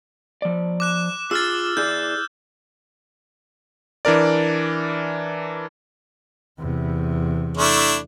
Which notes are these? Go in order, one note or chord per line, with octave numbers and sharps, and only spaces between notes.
F3 D5
D6 F#6 E7
F4 G#4 E6 F6 A6
E4 G#4 D5 G6
E3 D4 A#4 D5
E2 C3
A3 D4 E4